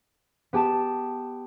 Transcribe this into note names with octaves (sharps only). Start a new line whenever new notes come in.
B3 G4 A5 E7